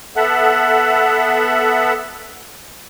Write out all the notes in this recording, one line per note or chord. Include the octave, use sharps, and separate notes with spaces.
B3 A4 E5 F#5